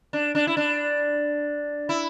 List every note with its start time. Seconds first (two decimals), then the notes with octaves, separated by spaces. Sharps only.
0.13 D4
0.35 D4
0.47 E4
0.57 D4
1.89 E4